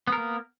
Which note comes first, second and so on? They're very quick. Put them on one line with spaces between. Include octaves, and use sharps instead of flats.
B3 A#4 A#3